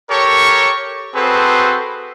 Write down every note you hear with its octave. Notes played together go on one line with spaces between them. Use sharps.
G4 A4 A#4 C#5 C#6
C4 F#4 G#4 A4 B4 C5